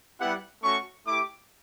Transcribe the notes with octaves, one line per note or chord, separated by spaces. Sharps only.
G3 B3 E4 G4 F#5
A3 C#4 F#4 C#6
A3 E4 G4 D6